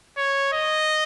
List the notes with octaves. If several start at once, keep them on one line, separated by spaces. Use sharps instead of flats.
C#5
D#5